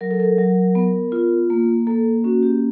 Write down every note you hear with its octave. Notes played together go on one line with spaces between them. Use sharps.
F#3 A#4
A4
A#4
F#3
B3
F4
A#3
A#3 A4
C#4 F#4
G4